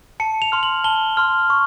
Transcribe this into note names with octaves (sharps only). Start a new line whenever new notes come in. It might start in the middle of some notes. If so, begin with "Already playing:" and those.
A5 C#7
F7
C6 F6
F#7
A5 G7
C6 F6
C#6